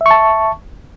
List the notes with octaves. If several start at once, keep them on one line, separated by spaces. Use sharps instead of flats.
E5 A5 C#6